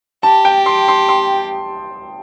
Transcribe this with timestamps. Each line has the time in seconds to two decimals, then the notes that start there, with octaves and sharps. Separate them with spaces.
0.23 G4 A5
0.45 G5
0.66 C6
0.88 C6
1.09 C6